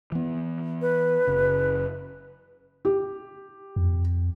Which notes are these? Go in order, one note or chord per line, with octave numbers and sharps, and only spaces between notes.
E3 B3
B4
F#1 C#3
G4
F2